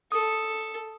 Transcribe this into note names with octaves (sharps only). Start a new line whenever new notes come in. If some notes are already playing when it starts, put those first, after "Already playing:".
A4 D#6